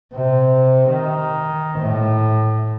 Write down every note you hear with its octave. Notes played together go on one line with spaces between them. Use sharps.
C3
D#3
A2